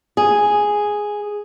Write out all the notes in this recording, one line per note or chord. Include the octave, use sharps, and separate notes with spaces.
G#4